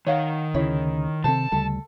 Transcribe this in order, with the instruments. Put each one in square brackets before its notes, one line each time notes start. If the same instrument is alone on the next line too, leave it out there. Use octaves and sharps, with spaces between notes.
[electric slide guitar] D#3 [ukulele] C#5 F5 F#5
[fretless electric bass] D2 C#3 [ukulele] E4 C#5
[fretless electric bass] C3 D#3 C4 [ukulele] A4 C5 [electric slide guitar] A5
[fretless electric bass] D2 C#3 G3 [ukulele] A4